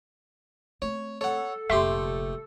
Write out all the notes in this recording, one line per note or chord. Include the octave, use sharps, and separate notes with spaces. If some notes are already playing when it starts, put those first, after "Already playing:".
A3 C4 C#5
A4 C#5 F#5
F1 A#2 A3 G4 E5 C6